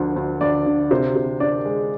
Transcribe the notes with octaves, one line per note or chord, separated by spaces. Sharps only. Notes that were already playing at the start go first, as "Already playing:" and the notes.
Already playing: D2 D3 F3
D2
D2 D5
D3
C3 C5
C3
D4 D5
G#3